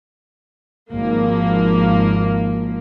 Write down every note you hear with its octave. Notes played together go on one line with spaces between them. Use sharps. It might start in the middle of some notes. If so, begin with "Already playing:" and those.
G#1 F3 A#3